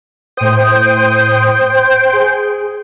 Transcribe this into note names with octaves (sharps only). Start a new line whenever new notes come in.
A2 C5 G5 D#6
G#4